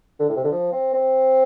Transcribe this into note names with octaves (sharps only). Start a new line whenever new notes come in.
D3
A2
C3
D3
F3
C4
C4